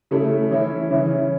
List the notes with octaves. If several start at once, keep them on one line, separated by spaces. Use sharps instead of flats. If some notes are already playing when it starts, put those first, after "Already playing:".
C#3 A3 E4
E3 C#4 E4
C#3 E3 C#4 E4